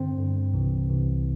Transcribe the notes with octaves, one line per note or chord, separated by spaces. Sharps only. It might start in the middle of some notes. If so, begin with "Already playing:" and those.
Already playing: G2 D3 C4
G2 D3
C2 C3 E3
C2 C3 E3